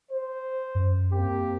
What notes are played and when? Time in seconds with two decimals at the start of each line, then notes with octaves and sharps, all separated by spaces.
0.12 C5
0.75 F#2
1.13 A#3 C4 G4